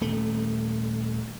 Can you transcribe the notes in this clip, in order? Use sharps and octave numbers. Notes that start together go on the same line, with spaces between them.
D#1 A3